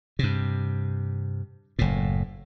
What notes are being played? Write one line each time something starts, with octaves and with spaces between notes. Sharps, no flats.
G2 C3
F#1 A2